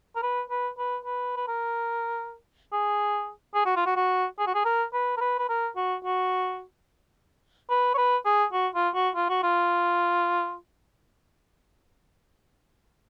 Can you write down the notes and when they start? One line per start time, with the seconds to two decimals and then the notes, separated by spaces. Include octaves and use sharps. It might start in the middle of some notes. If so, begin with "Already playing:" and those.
0.16 A#4
0.23 B4
0.50 B4
0.78 B4
1.05 B4
1.37 B4
1.48 A#4
2.73 G#4
3.54 G#4
3.66 F#4
3.76 F4
3.86 F#4
3.96 F#4
4.39 G#4
4.47 F#4
4.55 G#4
4.65 A#4
4.93 B4
5.17 A#4
5.21 B4
5.39 B4
5.49 A#4
5.76 F#4
6.05 F#4
7.70 B4
7.94 C#5
7.98 B4
8.25 G#4
8.53 F#4
8.75 F4
8.95 F#4
9.15 F4
9.29 F#4
9.43 F4